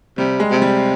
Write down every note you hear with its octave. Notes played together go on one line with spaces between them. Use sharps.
C3 G3
G#3
C3
G3